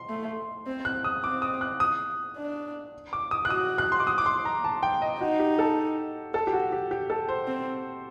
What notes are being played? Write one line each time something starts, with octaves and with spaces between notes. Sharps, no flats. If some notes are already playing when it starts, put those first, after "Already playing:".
Already playing: C6
A3
C4
F#6
D#6
C4 D6
D#6
F#6
D#6
D4
D6
D#6
F#6
F#4 D#6
F#6
C6
D6
D#6
D6
C6
A#5
A5
G5
D#5
D#4 F#4
G4
A4
A4
G4
F#4
G4
G4
A4
C5
C4